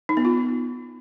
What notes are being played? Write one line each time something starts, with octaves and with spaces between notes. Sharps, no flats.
D#4
B3
F4